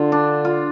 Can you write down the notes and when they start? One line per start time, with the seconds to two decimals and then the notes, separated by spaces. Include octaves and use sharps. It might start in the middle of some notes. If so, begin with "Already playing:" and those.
Already playing: D3 F4
0.12 D4
0.45 F4